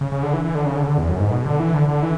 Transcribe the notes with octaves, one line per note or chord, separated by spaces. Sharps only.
C#3
C#3
D3
E3
E3
D3
C#3
D3
C#3
D3
E2
F#2
G#2
B2
D3
E3
D3
D3
E3